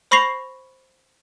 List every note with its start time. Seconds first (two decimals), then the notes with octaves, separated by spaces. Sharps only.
0.11 C5 B5 C#6 A#6 C7 F7